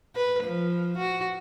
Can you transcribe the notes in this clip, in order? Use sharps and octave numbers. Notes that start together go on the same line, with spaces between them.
B4
F3
F#4